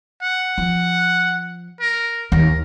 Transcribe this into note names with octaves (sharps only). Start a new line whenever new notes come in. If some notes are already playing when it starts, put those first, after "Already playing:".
F#5
F3
A#4
D#2 A#4